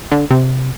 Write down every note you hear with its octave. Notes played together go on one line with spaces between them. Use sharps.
D3
C3